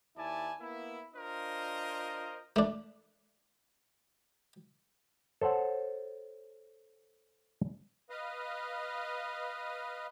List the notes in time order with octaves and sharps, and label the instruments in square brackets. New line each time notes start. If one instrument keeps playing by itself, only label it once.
[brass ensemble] D#2 E4 D5 G#5 A5
A#3 B3 E4
D4 F4 A#4 C5 D#5
[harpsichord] A3 D4
[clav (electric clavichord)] A4 C5 C#5 F#5
[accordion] B4 D#5 F5